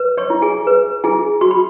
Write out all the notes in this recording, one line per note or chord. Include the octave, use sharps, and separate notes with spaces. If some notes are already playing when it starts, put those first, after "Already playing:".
Already playing: B4
C#5 C#6
E4
G#4 G#5
B4
E4 G#4 G#5
F#4 C#6
B5